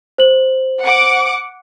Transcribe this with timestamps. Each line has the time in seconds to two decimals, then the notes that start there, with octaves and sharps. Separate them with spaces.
0.18 C5 F#7
0.81 F#5 D6